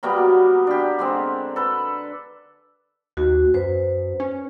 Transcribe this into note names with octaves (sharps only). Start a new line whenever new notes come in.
F#3 G3 A#3 B3
D4 G4
D3 G#3 C4
A4 B4
D#2 F#4
F#2 B4 C5
C#4